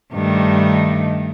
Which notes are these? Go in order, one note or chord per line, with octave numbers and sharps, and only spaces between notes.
G2 D#3 A3